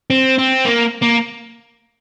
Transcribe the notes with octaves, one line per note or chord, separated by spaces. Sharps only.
C4
C4
A#3
A#3